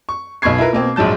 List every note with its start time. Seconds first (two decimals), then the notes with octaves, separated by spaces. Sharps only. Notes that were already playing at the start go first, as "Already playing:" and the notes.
0.09 C#6
0.42 B1 B2 B5 C#6 G#6 C7
0.58 E4 F4 A#4 B4
0.73 B2 A#3 C4
0.96 A#1 G#2 F#3 A5 G6